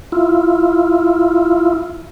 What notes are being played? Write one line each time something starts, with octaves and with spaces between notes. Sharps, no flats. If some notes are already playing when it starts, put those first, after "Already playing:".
E4 F4